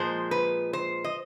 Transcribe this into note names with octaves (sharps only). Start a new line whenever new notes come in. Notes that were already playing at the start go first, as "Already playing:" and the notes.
Already playing: A#2 F3 G#3 C5
B4
C5
D#5